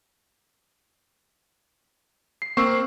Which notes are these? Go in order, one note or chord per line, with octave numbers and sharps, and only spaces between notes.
C7
A#3 C4 C#6 E6 C7